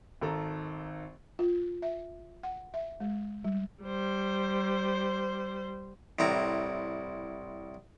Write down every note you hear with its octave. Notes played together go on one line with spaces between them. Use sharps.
G#1 D#3 A4 A#5
F4
E5
F#5
E5
G#3
G3
G3 C5
C2 A2 C4 A#5